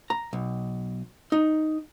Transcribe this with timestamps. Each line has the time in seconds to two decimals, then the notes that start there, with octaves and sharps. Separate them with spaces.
0.10 A#5
0.33 B1
1.32 D#4